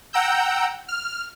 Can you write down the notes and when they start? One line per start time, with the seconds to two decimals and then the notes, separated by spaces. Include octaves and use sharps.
0.13 F#5 G5 A#5 E6 G6
0.88 F6